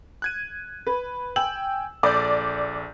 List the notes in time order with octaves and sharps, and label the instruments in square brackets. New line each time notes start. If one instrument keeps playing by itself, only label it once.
[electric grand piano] F#6 G#6 D#7
[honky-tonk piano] B4
[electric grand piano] G5 G#5 E6 [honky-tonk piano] F#7
[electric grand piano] A#1 A4 G6 [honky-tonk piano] D5